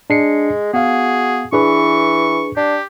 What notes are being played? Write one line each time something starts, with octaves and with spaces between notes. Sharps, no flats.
G#3 D4 C7 C#7
B3 F#4 G#4 F5
E3 D4 G#4 B4 C#6
D4 G4